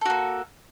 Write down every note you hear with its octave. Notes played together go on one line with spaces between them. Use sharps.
A#3 F#4 A4